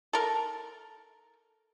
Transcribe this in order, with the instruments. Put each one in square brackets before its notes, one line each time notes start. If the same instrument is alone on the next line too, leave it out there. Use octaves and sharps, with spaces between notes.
[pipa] A4 A#4